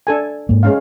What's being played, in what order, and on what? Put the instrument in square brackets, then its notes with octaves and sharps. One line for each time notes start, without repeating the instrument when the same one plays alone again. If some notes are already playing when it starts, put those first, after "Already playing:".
[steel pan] D4 A4 G#5
[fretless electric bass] G#2 A#3
[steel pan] G#3 C#4 F5